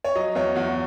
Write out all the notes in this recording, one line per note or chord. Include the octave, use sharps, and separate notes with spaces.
C#5
F#3 D#5
E2 C#5
E2 F#4